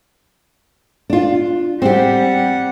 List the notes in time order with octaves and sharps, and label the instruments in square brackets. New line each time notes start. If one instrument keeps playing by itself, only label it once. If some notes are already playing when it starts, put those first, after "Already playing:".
[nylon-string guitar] D4 F4
[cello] G3 F#5 [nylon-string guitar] C4 G4